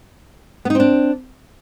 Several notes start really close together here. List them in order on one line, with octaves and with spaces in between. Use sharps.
B3 D#4 C4 D4